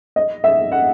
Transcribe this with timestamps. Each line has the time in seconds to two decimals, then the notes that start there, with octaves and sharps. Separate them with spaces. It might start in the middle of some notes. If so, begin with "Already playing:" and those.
0.16 D#5
0.44 E5
0.72 F#5